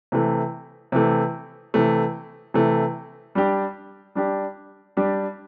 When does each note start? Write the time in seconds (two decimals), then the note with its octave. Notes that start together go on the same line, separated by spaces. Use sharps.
0.12 C3 E3 A3
0.92 C3 E3 A3
1.74 C3 E3 A3
2.54 C3 E3 A3
3.35 G3 D4 G4
4.15 G3 D4 G4
4.97 G3 D4 G4